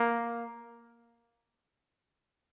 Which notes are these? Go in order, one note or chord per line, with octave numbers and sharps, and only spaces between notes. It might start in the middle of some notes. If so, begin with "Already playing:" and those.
Already playing: A#3